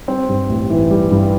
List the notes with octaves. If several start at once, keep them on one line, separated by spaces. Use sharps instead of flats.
G3 C4
G2
A1
E3
G3
G2